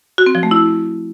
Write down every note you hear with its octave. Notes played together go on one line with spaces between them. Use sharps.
F#4
C4
F3
A3
E4